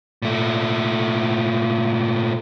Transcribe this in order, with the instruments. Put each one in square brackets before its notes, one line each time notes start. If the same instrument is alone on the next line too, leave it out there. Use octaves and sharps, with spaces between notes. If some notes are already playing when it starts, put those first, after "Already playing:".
[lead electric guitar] A#2 A3